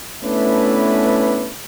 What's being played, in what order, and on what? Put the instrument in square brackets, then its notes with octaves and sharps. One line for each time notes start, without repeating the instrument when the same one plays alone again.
[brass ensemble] A3 B3 C#4 D4 E4 B4